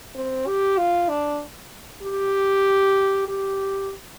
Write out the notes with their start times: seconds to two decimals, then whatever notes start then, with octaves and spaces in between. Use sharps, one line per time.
0.15 C4
0.47 G4
0.78 F4
1.09 D4
2.03 G4
3.28 G4